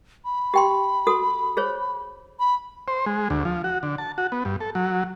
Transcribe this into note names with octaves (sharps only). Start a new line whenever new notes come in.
B5
G4 G5 C6
F#4 A4 D#6
G#4 C5 C#5
B5
C5
G#3
D2
F3
F#4
D3
A5
F#4
B3
G2
A4
F#3